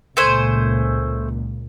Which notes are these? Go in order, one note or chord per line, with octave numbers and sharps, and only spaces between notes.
C#2 A#2 A3 C5 G#5